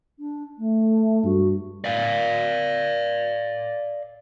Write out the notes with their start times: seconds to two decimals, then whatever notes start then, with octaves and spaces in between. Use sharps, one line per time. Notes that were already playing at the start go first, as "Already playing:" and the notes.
0.19 D4
0.58 A3
1.24 G2 F#4
1.84 D5 F5